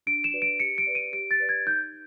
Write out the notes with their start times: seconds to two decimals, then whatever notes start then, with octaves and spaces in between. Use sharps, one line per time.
0.07 D4 D7
0.24 E7
0.33 F#4 B4 D5
0.42 D7
0.60 G4 C#7
0.78 D7
0.87 B4 D5
0.95 D#7
1.13 G4 D7
1.31 A6
1.40 B4 D5
1.49 G#6
1.66 D#4 G6